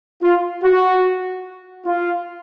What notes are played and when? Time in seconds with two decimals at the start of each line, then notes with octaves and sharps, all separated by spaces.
0.23 F4
0.64 F#4
1.86 F4